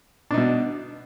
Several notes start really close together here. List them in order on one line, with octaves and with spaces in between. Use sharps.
D4 D#4 B2